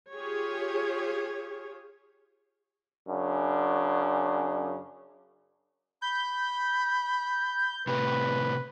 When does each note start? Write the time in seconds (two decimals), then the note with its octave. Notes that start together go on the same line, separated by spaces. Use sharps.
0.13 F4 G4 G#4 C#5
3.08 F#2 C#3 D4
6.02 B5 G6
7.87 A2 C3 B4